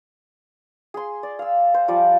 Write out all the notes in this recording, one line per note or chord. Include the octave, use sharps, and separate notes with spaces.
G#4 C6
D5
F5 E6
C5
F3 G3 D5